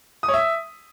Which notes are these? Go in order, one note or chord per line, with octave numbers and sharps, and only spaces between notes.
D#6
C#5
E5